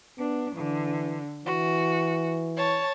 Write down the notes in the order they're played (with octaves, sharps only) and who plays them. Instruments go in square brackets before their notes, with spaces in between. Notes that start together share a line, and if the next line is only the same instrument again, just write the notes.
[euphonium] B3 [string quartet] D4
[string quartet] D3 [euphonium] E3
[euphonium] E3 [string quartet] F#4
[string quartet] C#5 A5